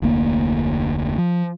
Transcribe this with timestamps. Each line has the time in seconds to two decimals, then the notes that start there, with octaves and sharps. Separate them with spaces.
0.02 F1 D2 A#3
1.18 F3